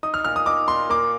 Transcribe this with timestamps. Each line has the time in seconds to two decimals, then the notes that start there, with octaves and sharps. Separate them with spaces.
0.03 D#4 D#6
0.14 F6
0.24 A#2 F6
0.36 D#6
0.46 D#4 D6
0.68 A#2 C6
0.90 A#3 D6